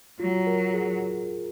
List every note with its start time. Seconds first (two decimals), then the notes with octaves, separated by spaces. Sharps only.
0.20 F#3 F4
0.47 A#4
0.74 G#4